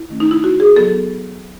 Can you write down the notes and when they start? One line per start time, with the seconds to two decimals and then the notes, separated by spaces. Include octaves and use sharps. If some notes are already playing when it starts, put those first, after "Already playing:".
Already playing: E4
0.10 D#3 A3 C#4
0.20 D#4
0.31 E4
0.44 F#4
0.60 G#4
0.76 F#3 B3 A4